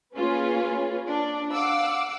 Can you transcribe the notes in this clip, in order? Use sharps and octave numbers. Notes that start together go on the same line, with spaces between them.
A#3 C#4 F4 G#4 B4
D4
F5 F#5 D6 E6